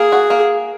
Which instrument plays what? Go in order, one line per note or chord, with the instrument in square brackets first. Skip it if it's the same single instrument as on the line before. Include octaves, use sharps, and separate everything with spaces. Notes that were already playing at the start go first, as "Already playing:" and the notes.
Already playing: [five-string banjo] A#3 [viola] G#4
[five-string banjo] F#4
A#3